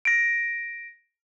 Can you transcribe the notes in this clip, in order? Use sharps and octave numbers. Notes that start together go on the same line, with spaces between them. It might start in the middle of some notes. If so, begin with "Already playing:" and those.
A#6 D7